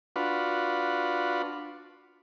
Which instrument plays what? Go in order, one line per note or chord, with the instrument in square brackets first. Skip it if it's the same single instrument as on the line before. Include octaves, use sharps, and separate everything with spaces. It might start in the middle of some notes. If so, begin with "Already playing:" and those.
[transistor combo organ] D4 F4 F#4 B4